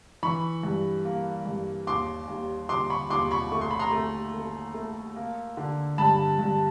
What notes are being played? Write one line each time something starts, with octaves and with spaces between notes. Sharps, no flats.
E3 B5 C#6
G2
A#3
G2
D#2 C6 D6
D#2
D#2 C6 D6
B5 C#6
D#2 C6 D6
B5 C#6
A3 C#6
C6
B5
A#5 C6
A3
A3
A3
A#3
D3
G2 A5 B5
G2